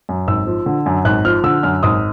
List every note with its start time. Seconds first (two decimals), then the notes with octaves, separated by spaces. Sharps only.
0.09 F#2
0.27 G#1 E6
0.47 F3
0.66 D3
0.86 F#2
1.05 G#1 F#6
1.25 F3 F6
1.44 D3 E6
1.63 F#2 F6
1.83 G#1 D#6